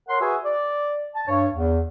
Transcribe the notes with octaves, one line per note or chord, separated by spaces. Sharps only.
A#4 C#5 F#5 C6
F#4 G#4 B4 E5 G#5
D5
A5
G2 C#5
E2